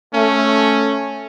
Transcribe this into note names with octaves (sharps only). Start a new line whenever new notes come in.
A3 C#4